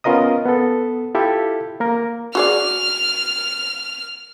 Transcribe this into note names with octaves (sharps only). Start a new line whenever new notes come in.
B3 C#4 F4 A#4 D#5 D#6
B3 A4
E4 F4 G4 A4 E5
A#3 A#4
F#4 G#4 D5 F6